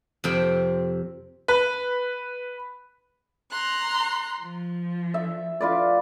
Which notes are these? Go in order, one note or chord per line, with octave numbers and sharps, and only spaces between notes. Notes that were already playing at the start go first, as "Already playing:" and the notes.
F2 C3 C4 G5
B4
A#5 C6 F#6
F3
E5
F4 B4 D5